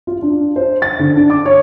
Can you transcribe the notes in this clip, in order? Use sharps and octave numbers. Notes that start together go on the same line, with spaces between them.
F4
D4
C5
A6
D3
D4
D6
C#5